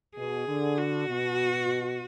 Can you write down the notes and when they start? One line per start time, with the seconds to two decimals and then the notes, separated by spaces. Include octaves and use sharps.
0.17 B2 G#4
0.48 D3
0.78 F#4
1.08 B2